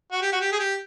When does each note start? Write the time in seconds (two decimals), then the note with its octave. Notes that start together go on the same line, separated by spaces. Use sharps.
0.12 F#4
0.22 G4
0.33 F#4
0.41 G4
0.52 G#4
0.59 G4